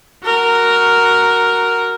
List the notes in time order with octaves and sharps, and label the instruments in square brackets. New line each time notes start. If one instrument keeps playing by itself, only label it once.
[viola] F#4 A#4